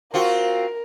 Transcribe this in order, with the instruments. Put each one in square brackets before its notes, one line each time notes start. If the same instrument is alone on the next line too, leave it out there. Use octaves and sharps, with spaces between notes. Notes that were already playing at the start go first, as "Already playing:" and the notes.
[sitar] C4 F4 F#4 [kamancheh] A#4